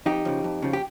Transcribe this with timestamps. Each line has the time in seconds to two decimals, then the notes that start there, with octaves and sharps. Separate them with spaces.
0.06 F2 D#4 G4
0.25 C#3 F3
0.44 F2
0.62 C#3 F3
0.73 G4